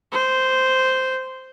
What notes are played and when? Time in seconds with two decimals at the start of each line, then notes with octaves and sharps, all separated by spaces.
0.12 C5